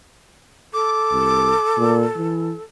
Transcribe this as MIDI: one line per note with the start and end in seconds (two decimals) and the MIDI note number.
0.74 2.62 69
0.74 1.95 86
1.12 1.52 36
1.77 2.05 46
2.16 2.52 52